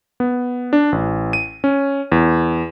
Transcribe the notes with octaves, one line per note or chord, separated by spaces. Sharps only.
B3
D4
A1
D#7
C#4
E2